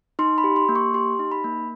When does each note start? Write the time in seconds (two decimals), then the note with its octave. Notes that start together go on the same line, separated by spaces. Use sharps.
0.19 D#4 C6
0.38 B5
0.44 G4
0.56 C6
0.69 A#3
0.76 C#6
0.94 G4 C6
1.19 D#4
1.32 B5
1.44 A#3